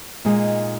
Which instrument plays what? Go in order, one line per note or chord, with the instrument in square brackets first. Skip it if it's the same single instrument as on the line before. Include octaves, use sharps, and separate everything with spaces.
[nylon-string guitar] A#2 G#3 D#4 G#4 D#5